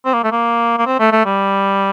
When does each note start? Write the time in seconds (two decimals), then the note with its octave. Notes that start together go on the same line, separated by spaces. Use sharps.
0.05 C4
0.14 A#3
0.23 A3
0.32 A#3
0.78 A#3
0.86 C4
0.99 A3
1.12 A3
1.26 G3